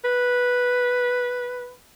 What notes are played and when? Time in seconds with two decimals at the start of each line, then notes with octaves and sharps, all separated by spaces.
0.05 B4